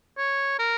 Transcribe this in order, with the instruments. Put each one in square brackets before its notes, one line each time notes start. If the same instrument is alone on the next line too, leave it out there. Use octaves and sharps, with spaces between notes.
[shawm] C#5
A#4